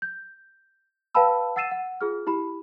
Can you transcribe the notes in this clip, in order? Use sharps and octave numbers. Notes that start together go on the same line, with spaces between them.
G6
B4 F5 G5 A5 B5 E6
F#5 E6 A6 C7 D#7 E7
F#5
F4 G#4 F6
E4 G4 B5